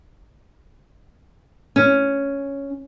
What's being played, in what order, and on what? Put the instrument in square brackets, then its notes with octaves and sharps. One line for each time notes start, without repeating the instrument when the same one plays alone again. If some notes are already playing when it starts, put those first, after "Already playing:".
[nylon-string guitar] C#4